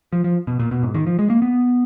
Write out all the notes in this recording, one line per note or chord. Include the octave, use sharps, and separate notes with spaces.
F3
F3
B2
A#2
B2
G#2
D#3
F3
G#3
A#3
B3